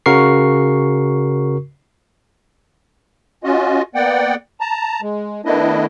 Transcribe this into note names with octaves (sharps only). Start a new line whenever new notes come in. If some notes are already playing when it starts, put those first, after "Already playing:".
C#3 F#4 A#4 C#6 C7
C#4 F4 F#4 D#5
A#3 B3 D5 F#5 G5
A5 A#5
G#3
D#3 A3 B3 D4 E4 D#5